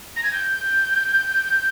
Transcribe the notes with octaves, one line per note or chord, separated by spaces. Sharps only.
A#6
G#6
G6